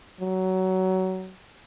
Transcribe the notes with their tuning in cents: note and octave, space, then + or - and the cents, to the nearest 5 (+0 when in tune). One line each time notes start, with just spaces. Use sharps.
F#3 +20